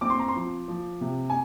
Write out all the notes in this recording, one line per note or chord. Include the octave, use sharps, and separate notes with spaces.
C4 D6
C6
A#5
C6
F3
F3
C3
G#5